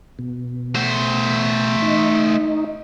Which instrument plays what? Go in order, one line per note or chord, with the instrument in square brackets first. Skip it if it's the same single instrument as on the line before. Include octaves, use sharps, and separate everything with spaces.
[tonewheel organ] B2
[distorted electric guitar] A3 C5
[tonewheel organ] D#4